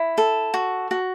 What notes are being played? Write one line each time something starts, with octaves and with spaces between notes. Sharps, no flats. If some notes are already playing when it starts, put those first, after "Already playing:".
Already playing: E4
A4
F#4
F#4